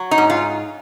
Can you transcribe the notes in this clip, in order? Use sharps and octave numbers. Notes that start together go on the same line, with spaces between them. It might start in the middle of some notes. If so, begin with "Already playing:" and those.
Already playing: F#3
D#4
G#2
F4